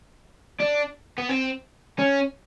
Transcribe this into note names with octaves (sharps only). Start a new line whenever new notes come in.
D4
B3
C4
C#4